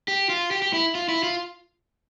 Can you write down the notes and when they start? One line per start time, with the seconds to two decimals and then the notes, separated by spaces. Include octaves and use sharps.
0.08 G4
0.30 F4
0.51 G4
0.62 G4
0.73 E4
0.95 F4
1.09 E4
1.23 F4